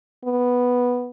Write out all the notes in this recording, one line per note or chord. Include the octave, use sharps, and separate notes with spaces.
B3